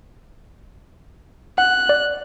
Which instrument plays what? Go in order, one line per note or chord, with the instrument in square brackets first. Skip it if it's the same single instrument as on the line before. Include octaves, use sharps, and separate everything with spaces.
[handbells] F#5 [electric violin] F#6
[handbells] D5